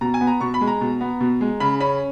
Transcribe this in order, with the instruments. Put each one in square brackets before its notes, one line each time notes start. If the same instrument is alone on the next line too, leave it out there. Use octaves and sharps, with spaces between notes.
[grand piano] B2 A#5
G#5
B3
A#5
B2 C#6
B5
G#3
A#5
B2
B3
B2
G#3
C#3 B5
C#4 B5